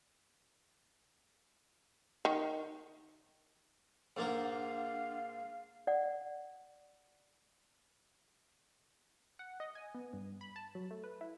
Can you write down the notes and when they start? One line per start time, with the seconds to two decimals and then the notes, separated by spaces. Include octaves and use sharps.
2.25 D#3
4.17 G#2 A#3 D4 A#4 F5 F#5
5.87 D5 F#5
9.39 F#5
9.60 D#5
9.75 G#5
9.95 B3
10.13 G2
10.41 B5
10.56 A5
10.75 F#3
10.91 A3
11.04 B4
11.21 E4